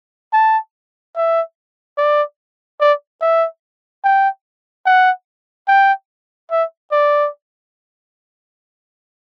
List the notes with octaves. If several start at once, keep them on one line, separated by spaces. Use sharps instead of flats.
A5
E5
D5
D5
E5
G5
F#5
G5
E5
D5